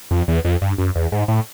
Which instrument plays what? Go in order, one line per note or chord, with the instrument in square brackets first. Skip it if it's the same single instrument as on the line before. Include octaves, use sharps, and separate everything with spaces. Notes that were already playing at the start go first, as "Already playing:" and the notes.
[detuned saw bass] F2
E2
F2
G2
F#2
E2
G#2
A2